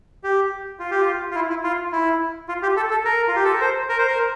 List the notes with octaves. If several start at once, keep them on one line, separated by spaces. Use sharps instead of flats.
G4
F4
G4
F4
F4
E4
E4
F4
E4
F4
G4
A4
A4
A#4
F4
G4
A4
A#4
C5
A#4
C5
A#4